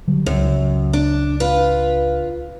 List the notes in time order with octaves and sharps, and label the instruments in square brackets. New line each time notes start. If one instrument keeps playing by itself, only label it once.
[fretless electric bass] D3 F#3 G3
[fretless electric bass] C#2 [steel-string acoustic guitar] F#2
[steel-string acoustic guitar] D4
F4 B4